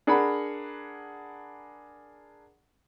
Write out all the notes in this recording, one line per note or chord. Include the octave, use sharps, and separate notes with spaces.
D4 G#4 A#4 F#5 A#5 B5